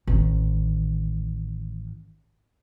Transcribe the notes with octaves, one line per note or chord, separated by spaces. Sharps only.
A1 D#3